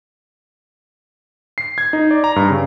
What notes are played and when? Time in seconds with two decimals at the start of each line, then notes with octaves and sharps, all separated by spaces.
1.58 C7
1.78 G#6
1.93 D#4
2.11 D5
2.24 A#5
2.36 G2
2.50 C#3